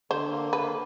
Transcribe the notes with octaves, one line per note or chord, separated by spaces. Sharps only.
D3 C5
A#3
D3 B4